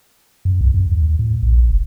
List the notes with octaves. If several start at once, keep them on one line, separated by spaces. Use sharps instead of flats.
F#2
C2
F#2
D#2
A2
A#1
F1